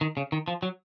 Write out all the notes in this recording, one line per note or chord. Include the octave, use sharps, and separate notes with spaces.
D#3
C#3
D#3
F3
F#3